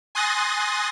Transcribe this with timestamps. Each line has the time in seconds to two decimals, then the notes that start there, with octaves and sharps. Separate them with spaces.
0.15 G#5 C6 D#6 F#6 A6 A#6